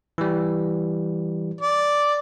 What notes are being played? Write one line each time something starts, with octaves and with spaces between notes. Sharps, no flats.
E3 G3
D5